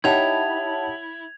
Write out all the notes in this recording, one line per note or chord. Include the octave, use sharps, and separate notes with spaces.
D#4 E4 G4 C#5 F#5 A5 G#6 F7